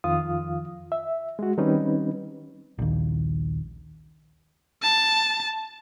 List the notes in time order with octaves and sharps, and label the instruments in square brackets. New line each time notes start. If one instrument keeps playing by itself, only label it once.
[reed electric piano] F2 D#3 F3 F4 F5 D#6
E5
G#3 F#4
D#3 G3 C4 C#4 D#4 B4
[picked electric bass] A#1 D#2
[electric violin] A5